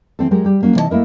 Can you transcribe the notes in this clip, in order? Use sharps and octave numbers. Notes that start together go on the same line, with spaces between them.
E3 C4 A4
F#3 G#3 G4 A#4
G3 G4
F#3 A#3 C#4 F#4
C3 E3 D#4 C5 D#5 A5
A3 A#3 E4 A#4 D#5